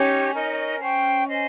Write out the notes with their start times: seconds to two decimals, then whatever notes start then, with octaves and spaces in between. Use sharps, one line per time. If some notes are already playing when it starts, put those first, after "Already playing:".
Already playing: C#4 D#4 G4 C#5
0.34 D#4 A#4 D#5
0.80 C5 G5 C#6
1.27 C5 D#5 G#5